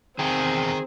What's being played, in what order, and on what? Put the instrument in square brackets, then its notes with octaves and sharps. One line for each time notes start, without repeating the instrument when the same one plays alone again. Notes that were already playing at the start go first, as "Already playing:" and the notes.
[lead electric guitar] E2 C3 [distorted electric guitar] D#3 [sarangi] C4 [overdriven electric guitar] G#4